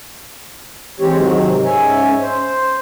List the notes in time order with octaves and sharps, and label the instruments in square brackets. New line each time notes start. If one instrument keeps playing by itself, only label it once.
[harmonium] E3 G#3 C4 G4 C#5
G#2 C3 D#3 F#3
G#2 C#4 C#5 E5 G#5
C5